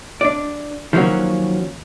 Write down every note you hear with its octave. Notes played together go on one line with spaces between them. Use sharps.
D4 D5
D#3 F3 F#3 A#3 C#4 F#4